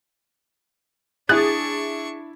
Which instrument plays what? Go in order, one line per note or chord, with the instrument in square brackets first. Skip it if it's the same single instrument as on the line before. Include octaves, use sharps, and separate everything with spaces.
[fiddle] D4 C#6 [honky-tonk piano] E4 A6 [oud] G#4 [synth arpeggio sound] F#6